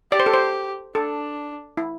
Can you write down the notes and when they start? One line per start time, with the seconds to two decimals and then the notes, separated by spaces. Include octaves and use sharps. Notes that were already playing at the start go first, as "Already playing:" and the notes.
0.12 G4 D5
0.20 C5
0.26 A4
0.33 C5
0.95 D4 A4
1.77 E4